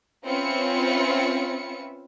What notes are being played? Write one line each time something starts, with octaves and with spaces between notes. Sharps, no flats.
C4 C#4 F4 B4 E5 C#7